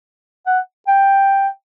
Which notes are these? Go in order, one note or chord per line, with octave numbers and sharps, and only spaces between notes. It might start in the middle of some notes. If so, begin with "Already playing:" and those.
F#5
G5